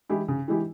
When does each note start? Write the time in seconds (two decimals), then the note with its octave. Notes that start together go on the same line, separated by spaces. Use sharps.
0.09 E3 G#3 E4 G4
0.28 C#3
0.48 E3 G#3 E4 G4